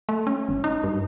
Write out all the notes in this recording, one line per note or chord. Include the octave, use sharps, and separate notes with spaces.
A3
C#4
G#1
D#4
G2